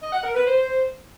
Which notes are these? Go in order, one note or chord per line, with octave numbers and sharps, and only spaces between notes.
D#5
F#5
A#4
B4
C5